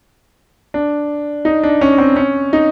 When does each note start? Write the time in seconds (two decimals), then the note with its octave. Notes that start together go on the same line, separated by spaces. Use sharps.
0.74 D4
1.45 D#4
1.63 D4
1.81 C#4
1.98 C4
2.16 C#4
2.53 D#4